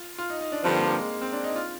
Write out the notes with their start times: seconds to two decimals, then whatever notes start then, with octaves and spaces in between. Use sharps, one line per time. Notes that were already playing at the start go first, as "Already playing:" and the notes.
Already playing: F4
0.18 F4
0.30 D#4
0.41 D#4
0.52 D4
0.64 G2 D3 F3 C4
0.75 A#3
0.87 A#3
0.99 G#3
1.10 G#3
1.22 C4
1.33 D4
1.44 D#4
1.56 F4